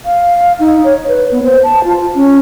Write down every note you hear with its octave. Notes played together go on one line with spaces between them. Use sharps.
F5
D#4
C#5
B4
B3
C5
A5
F4
C#4